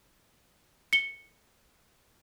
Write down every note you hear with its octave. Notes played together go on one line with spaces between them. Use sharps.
C#7 G7